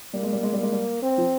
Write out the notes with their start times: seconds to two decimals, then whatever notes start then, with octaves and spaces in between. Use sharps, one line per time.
0.14 G3 A#3
0.23 G#3
0.33 G3
0.43 G#3
0.53 G3
0.58 G#3 A#3
0.72 G3
1.03 C4
1.18 F3